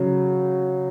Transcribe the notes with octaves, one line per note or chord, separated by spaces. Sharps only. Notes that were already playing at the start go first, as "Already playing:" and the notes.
Already playing: C#3 F#3